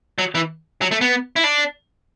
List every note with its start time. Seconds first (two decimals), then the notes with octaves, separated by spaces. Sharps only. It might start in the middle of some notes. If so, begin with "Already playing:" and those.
0.18 F#3
0.35 E3
0.82 F#3
0.91 A3
1.01 B3
1.36 E4
1.44 D4